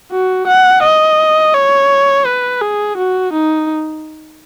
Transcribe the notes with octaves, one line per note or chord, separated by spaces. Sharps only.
F#4
F#5
D#5
C#5
B4
G#4
F#4
D#4